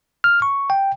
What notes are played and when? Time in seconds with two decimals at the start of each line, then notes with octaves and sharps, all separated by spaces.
0.24 F6
0.42 C#6
0.70 G5